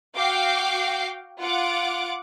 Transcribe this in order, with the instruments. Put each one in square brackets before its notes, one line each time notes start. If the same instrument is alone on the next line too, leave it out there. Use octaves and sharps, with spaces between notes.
[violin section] F#4 F5 G5 D6 C7
F4 F#5 D6